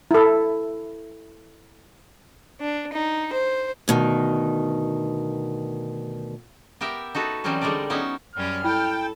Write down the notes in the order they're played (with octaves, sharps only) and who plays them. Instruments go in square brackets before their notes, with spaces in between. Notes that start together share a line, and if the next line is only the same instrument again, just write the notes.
[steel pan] E4 A4
[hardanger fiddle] D4
D#4
C5
[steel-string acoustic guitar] D2 B2 D#3
[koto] B3 G4 A#4 E5
D#4 F#4 A4 B4
E3 F#3 G3 C4 C#4 D#4
D3 G3 G#3 D#4 A#4 D5
F#3 B3 C#4 D#4 E4
[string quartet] F#2 G3 C#4 [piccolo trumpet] F6
[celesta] E4 B5 [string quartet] A4 [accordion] G5